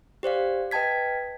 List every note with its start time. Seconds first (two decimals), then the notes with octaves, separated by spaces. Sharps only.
0.23 G4 C5 D5 F5
0.71 B4 D#5 G5 A5 G#6 B6